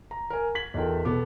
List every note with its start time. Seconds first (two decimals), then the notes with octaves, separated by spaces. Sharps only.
0.11 A#5
0.30 A#4 G#5
0.55 G#6 B6 F#7
0.74 E2 D#4 F4 A4 A#4 G5
1.05 B2 B3 A4 D6